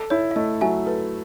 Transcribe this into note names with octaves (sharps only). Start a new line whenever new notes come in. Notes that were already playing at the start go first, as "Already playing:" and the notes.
Already playing: A4
E4 C#5
E5
A3 D#5
F#3 E5 G#5
A4 B4